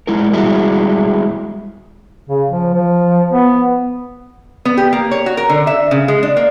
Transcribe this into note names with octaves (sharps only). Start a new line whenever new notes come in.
G#3 E4 A#4
G3 G#3 E4 F#4
C#3
F3
F3
B3
B3
G4
A#3
C#5
F#4
A#4
D3
E5
C#3
G#3
D4
A#3